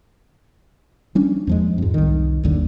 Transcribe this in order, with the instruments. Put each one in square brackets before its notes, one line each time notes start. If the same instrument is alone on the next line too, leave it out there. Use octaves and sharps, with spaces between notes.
[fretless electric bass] G3 C#4 D4
E2 F3 G#3
F2 G#2
C2 D#3
G1 D#2 D3